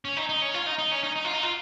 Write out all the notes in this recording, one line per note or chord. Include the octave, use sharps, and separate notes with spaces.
C#4
D#4
D#4
C#4
F4
D#4
D#4
C#4
D#4
D#4
F4
D#4
F4